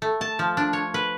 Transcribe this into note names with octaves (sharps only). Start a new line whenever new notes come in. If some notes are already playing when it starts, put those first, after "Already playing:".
A3
A5
F3
D4
C#5
B4